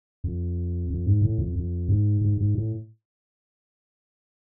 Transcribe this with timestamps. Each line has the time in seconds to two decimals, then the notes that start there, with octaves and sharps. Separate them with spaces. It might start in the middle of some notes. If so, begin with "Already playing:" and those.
0.24 F2
0.90 F2
1.06 G#2
1.22 A2
1.38 F2
1.56 F2
1.89 G#2
2.21 G#2
2.37 G#2
2.55 A2